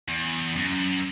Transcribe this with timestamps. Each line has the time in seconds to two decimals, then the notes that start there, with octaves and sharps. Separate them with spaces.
0.09 E2
0.56 F#2